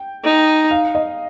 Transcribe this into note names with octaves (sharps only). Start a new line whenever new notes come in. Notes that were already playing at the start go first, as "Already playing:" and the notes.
Already playing: G5
D#4
F5
D#5